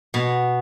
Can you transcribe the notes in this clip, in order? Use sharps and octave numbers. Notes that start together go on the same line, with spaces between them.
B2